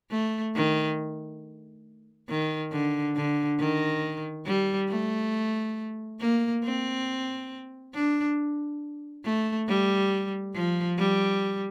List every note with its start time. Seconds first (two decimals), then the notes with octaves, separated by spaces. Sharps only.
0.11 A3
0.55 D#3
2.29 D#3
2.72 D3
3.16 D3
3.59 D#3
4.46 G3
4.89 A3
6.20 A#3
6.64 C4
7.94 D4
9.25 A3
9.68 G3
10.54 F3
10.98 G3